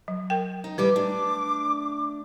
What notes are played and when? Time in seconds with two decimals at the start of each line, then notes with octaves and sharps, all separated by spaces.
0.08 F#3
0.30 A#4 G5
0.64 D#4
0.78 A2 G3 B4 G5 D6
0.96 A3 D4